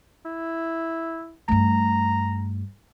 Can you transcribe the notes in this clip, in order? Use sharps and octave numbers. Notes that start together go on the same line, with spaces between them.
E4
G2 A3 A#5